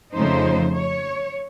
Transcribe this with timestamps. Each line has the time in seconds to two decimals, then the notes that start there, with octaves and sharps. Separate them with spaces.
0.14 F2 C#3 F3 A3 D#4 C5
0.76 C#5